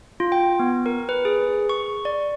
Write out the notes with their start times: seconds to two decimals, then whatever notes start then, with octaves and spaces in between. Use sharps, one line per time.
0.20 F4
0.32 G5
0.59 B3
0.86 A#4
1.09 B4
1.25 G#4
1.69 C#6
2.05 D5